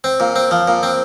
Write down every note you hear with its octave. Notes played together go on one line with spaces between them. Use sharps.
C4
A#2
C4
F3
A#2
C4